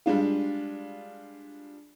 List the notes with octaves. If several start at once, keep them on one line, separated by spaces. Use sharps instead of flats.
G3 G#3 D4 F4